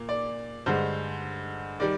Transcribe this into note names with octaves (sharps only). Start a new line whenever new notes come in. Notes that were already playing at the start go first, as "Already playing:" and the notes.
Already playing: A#2 A#3
D5
G2 D3 G#3 C5
D#3 G3 D5